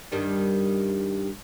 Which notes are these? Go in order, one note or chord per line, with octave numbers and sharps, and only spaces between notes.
G2 D#3 G3